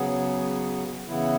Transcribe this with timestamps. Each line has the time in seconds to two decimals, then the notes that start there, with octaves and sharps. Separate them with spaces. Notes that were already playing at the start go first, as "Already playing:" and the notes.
Already playing: C#3 F#3 B3 G#4
1.07 C#3 E3 B3 E4